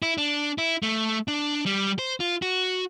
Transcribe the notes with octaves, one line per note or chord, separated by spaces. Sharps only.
E4
D4
E4
A3
D4
G3
C5
F4
F#4